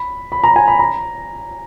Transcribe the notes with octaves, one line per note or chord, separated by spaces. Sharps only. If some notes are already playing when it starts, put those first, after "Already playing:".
Already playing: B5
B5
A#5
G#5
B5
A#5